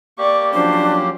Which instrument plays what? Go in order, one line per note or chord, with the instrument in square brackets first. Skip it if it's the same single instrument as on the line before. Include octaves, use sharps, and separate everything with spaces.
[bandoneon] A#3 G4 [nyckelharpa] D5 C#6
[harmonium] F3 F#3 C#4 [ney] D4 [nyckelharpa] C5